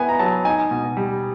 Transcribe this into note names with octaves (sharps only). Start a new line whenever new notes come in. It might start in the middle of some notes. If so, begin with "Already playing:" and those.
Already playing: B3 E4 G#5
A#5
F#3 A5
D#4 G#5
B2
G3